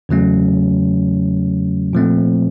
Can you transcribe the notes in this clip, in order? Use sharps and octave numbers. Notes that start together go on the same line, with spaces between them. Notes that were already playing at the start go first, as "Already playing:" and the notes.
E2 C#3 F#3 A3 C#4
A#2 F3 A3 C4